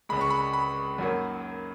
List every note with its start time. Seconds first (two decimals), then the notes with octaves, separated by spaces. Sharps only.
0.09 C#2 C#3 G#3 B5
0.21 C#6
0.30 B5
0.53 B5
0.98 F#2 D#3 F#3 A#3